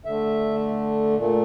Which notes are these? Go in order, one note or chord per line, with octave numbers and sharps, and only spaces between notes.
D3 A3 E5
A#2 A3